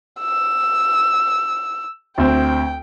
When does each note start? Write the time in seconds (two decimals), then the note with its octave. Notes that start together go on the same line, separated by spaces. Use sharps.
0.21 E6
2.18 D2 C4 G5